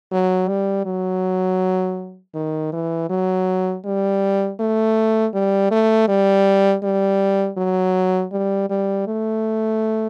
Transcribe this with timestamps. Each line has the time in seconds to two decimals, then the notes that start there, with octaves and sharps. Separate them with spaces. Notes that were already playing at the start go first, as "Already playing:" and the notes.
0.12 F#3
0.48 G3
0.86 F#3
2.35 D#3
2.73 E3
3.10 F#3
3.85 G3
4.60 A3
5.34 G3
5.71 A3
6.08 G3
6.83 G3
7.58 F#3
8.32 G3
8.70 G3
9.07 A3